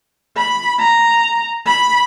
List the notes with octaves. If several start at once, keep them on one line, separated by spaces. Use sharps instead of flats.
B5
A#5
B5